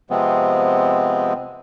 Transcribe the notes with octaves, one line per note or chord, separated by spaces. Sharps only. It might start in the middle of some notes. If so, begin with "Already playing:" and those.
C3 F3 G#3 B3 C4